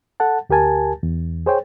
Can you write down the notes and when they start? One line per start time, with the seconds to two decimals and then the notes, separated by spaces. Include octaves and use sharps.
0.20 A4 F#5 A5
0.49 D2 G4 A#4 G#5 A5
1.03 E2
1.46 G#4 C5 C#5 G5